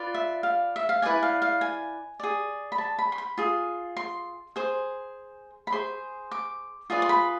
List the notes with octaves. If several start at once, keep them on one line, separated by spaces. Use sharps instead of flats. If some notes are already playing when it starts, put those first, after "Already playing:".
Already playing: F4 B4 D5
E5
F5
E5
F5
E4 B4 D5 G#5
F5
F5
G#5
G#4 D5
B5
A5
B5
C6
B5
F4 G#4
C6
G#4 C5
B5
G#4 C5 C6
D6
F4 G#4 B4 D5
C6
B5